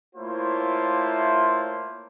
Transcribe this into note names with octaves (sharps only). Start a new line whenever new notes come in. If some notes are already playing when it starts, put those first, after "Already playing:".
A3 A#3 E4 F4 C5 C#5